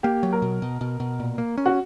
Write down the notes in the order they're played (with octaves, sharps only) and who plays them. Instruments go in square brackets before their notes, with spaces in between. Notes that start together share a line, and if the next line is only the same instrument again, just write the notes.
[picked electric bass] A#3 [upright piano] G4
[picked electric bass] F#3
[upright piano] A#4
[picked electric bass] B2
B2
B2
B2
A#2
A#3
C#4
[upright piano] F#4